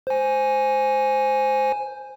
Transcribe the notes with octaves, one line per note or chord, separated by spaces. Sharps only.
C5 G#5